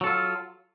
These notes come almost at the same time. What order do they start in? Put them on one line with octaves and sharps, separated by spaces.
F#3 A4 F4